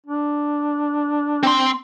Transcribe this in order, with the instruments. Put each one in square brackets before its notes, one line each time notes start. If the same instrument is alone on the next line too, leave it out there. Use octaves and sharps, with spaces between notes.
[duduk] D4
[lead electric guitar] C4 C6